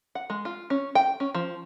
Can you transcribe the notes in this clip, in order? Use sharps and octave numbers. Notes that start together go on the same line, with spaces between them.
F#5
G#3
F4
C#4
G5
C#4
F3